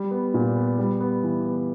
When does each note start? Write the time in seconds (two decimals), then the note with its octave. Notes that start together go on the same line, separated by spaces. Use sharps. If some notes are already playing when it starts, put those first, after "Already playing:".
Already playing: G3
0.11 B3
0.34 A#2
0.56 B3
0.79 G3
1.00 B3
1.23 E3
1.46 B3